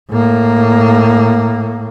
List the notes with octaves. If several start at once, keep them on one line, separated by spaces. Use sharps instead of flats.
A2 A#3